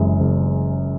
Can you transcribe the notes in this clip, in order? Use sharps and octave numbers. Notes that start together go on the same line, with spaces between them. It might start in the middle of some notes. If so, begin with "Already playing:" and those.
Already playing: F#1 F#2 E3 G#3
F#1